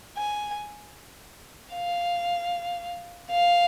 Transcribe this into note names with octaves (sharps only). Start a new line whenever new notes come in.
G#5
F5
F5